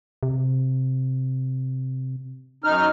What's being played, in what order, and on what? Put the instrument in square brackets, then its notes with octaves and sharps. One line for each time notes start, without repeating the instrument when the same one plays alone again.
[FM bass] C3
[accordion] F#2 D#4 F6